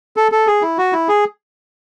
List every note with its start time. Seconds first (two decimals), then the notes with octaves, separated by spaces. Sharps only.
0.17 A4
0.32 A4
0.47 G#4
0.62 E4
0.78 F#4
0.93 E4
1.09 G#4